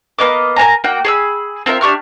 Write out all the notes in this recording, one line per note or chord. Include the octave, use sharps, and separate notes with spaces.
A#3 B3 D#5 D6
A#4 C#5 G#5 A#5
A#3 F#4 F#5 G5
G#4 B5 E6
C4 F4 A#4 E5
D4 G4 C#6 F6